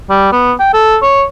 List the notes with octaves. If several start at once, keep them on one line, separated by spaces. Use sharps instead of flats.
G3
B3
G5
A4
C#5